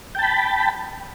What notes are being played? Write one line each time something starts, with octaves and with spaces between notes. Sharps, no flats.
G5 A5 B5